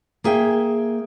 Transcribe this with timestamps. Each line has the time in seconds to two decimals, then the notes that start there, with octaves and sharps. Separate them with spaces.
0.24 A#3 G#4 E5 G5